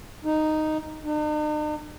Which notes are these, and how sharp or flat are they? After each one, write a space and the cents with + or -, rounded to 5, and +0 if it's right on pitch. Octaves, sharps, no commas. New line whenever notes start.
D#4 -5
D#4 -45